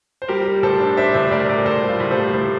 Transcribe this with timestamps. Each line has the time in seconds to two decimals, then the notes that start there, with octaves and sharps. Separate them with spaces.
0.22 C5
0.28 G3 G4 A#4
0.46 G3
0.63 A2 A4 C5
0.80 D4
0.97 D4 C5 E5
1.14 A2 C5 E5
1.31 A2 A#4 D5
1.49 A2 A#4 D5
1.65 A2 A4 C5
1.84 G3
1.89 F4 A4
2.00 A2
2.11 A4 C5
2.17 G3
2.34 A2 A4 C5